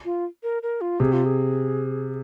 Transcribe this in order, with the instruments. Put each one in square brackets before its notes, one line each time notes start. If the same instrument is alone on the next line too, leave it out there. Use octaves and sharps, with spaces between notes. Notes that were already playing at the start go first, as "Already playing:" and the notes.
[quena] F4
A#4
A#4
F4
[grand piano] C3 [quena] G#4
[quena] F4
G#4